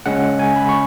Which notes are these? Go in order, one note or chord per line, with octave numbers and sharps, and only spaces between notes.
C#3 G#3 C#4 F#5
G#5
B5
C#6